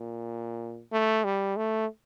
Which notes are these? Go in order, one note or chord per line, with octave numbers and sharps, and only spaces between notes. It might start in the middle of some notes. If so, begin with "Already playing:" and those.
Already playing: A#2
A3
G3
A3